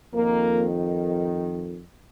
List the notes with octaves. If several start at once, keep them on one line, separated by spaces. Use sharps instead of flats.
F2 D#3 A#3